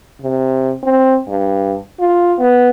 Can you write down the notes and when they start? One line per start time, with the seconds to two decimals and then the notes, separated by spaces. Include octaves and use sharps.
0.21 C3
0.83 C4
1.28 G2
2.00 F4
2.39 B3